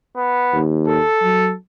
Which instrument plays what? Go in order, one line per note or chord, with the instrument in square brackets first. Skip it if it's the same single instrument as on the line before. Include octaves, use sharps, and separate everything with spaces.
[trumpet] B3
[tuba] D#2
[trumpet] A4
[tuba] F#3